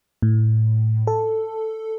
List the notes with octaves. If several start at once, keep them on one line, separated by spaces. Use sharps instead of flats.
A2
A4